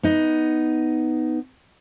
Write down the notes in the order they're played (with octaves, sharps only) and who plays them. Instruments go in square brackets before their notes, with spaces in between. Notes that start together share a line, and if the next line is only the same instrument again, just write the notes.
[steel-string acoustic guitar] B3 D#4